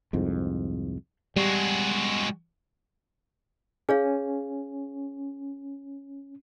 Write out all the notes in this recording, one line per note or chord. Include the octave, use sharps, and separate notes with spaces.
C2 F2 G#2
G3 G#3 F#4
C#4 G#4 C#5 F5